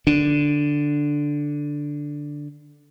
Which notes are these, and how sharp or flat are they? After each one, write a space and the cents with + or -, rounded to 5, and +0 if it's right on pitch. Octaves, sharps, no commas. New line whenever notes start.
D3 +0 D4 +0